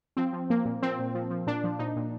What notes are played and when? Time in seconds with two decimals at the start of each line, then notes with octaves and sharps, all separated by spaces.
0.17 F3 C4
0.33 F3
0.50 F3 A#3
0.65 A#2
0.82 F3 C4
0.99 A#2
1.15 F3
1.30 F3
1.47 A#2 D4
1.64 F3
1.79 A#2 D#4
1.96 A#2